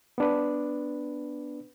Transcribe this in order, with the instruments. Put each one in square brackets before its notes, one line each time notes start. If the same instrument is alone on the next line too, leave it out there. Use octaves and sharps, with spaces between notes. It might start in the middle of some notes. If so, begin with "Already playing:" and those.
[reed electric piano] B3 D4 B4